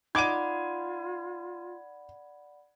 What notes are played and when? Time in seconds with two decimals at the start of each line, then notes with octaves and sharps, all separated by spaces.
0.15 D#4 F4 D5 F#5 B5 D6 G#6 D#7